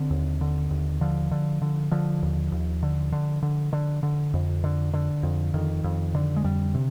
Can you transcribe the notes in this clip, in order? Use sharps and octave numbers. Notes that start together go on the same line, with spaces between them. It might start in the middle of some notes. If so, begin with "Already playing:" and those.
Already playing: D3 C4
D#2
D3
D#2
D3 F3
D3
D3
D3 F3
D#2
D#2
D3
D3
D3
D3
D3
F2
D3
D3
F2
F2 D#3
F2
D3
G#3
F2 G3
C3